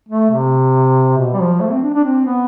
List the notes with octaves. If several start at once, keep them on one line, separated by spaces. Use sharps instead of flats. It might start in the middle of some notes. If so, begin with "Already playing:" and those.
A3
C3
B2
G3
F3
A3
C4
D4
D4
C4
B3